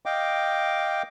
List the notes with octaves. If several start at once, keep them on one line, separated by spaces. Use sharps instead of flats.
D#5 F5 G5 D6